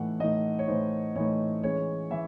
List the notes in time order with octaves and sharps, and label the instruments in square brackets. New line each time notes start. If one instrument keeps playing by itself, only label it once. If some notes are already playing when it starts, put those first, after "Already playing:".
Already playing: [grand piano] A2 E3 A3 D#4 F#5
A2 E3 A3 D#4 D#5
C#5
A2 E3 A3 D#4 C5
A2 E3 A3 D#4 C#5
E3 G#3 C#4 C#5
E3 E5